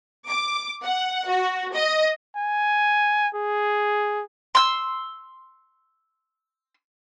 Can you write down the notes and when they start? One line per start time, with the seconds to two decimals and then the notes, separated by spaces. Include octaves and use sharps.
0.29 D6
0.84 F#5
1.28 F#4
1.72 D#5
2.36 G#5
3.34 G#4
4.55 C6 E6